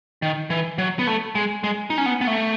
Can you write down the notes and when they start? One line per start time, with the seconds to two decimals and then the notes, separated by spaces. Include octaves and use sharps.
0.22 D#3
0.50 E3
0.78 F#3
0.99 B3
1.07 A3
1.35 G#3
1.64 G#3
1.90 D#4
1.98 C#4
2.06 B3
2.21 B3
2.27 A3